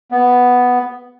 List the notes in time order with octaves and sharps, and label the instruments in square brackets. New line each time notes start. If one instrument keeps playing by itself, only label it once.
[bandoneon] B3